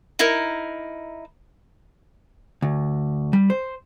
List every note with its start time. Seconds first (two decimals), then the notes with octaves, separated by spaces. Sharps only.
0.19 D#4 E4 A#4
2.62 D2
3.33 G3
3.50 C5